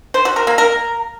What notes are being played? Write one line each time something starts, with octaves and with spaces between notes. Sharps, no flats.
C5
F#4
A#4
A#3
A#4